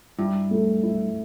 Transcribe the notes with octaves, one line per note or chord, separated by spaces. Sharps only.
G2 E4
A3
E4